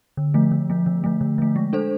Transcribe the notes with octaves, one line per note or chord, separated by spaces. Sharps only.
D3
F3 A3
D3
F3 A3
D3
F3 A3
D3
F3 A3
G#3
D4 A4 C5